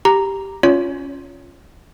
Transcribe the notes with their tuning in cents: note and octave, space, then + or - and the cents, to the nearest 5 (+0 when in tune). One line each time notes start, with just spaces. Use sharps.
G4 +0 A#5 +0
C#4 +0 F4 +0 C#5 +25